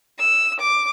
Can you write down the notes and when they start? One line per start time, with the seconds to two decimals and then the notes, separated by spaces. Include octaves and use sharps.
0.19 E6
0.60 D6